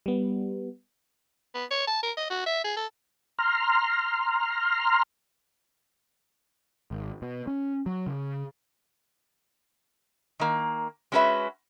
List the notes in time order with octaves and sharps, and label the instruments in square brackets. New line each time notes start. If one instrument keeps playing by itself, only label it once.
[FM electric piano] G3 B3
[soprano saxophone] B3
C#5
A5
A#4
D#5
F#4
E5
G#4
A4
[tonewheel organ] A#5 C6 F6
[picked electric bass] G#1
B2
C#4
F#3
C#3
[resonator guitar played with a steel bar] D#3 A#3
G#3 C#4 F#4 G#4 B4 E5